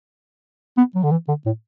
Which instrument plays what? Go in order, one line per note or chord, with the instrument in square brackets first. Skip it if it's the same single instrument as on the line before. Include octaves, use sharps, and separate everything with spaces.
[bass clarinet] B3
F#3
D3
E3
D3
A2